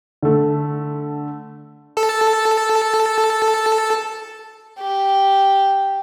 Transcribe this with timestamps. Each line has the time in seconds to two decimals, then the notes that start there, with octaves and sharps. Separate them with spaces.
0.22 D3 A3
1.97 A4 A5
4.80 G4